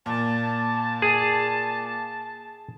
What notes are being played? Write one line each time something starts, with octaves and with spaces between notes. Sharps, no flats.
A#2 A5
G#4